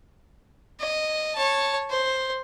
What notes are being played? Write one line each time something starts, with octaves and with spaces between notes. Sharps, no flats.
D#5
C#5 A5
C5